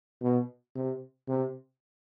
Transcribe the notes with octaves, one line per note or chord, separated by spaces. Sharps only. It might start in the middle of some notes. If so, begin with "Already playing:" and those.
B2
C3
C3